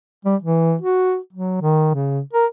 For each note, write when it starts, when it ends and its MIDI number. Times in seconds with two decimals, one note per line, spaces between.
0.25 0.36 55
0.43 0.76 52
0.82 1.18 66
1.33 1.61 54
1.62 1.90 51
1.94 2.20 49
2.33 2.46 70